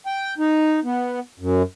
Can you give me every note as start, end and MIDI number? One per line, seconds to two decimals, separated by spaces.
0.06 0.34 79
0.38 0.80 63
0.84 1.20 59
1.39 1.62 42